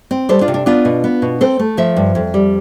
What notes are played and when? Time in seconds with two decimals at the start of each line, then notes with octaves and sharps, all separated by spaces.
0.11 C4
0.29 G3 A4 C5
0.41 D4 F4
0.48 C3
0.54 D4
0.66 B3 D4 F4
0.85 B2
1.04 B3
1.22 B2
1.41 C4 A4 C5
1.59 A3
1.77 F3 C5 E5
1.96 G2
2.15 F2
2.34 G3